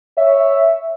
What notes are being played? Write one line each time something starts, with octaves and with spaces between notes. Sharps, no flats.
C#5 E5